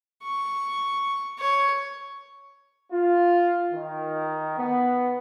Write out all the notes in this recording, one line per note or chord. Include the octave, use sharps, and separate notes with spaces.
C#6
C#5
F4
D#3
B3